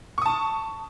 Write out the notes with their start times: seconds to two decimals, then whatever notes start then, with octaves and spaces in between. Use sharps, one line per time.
0.18 C#6
0.22 D#6
0.26 A5